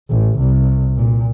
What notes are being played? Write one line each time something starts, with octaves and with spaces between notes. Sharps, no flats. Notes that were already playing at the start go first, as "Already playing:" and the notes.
A1
C2
A#2